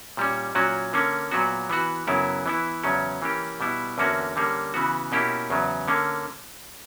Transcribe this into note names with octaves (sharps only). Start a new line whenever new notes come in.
A#2 G3 C#4
A#2 F#3 C#4 F#4
D3 A#3 C#4
A#2 F#3 B3 F#4
E3 B3 F#4
F#2 C#3 F#3 B3 E4
E3 B3 E4
E2 C#3 F#3 C#4
E3 A#3 C#4 G4
B2 G3 B3 E4
E2 D3 A#3 C#4 F#4
D3 G3 A#3 C#4
C#3 E3 B3 F#4
B2 A#3 C#4 E4 G4
E2 C#3 F#3
D3 A#3 C#4